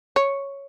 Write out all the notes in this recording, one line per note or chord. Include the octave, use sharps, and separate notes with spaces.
C#5